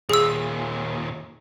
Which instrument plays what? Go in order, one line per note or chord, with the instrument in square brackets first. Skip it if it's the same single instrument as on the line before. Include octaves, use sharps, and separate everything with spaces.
[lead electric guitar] D#2 A#2 [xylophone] G#4 E6